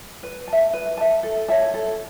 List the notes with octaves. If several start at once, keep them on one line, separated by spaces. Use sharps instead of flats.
B4
A5
E5
B4
E5 A5
A4
C#5 E5 A5
A4